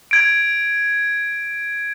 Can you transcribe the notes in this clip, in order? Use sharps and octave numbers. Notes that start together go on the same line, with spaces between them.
G#6 D7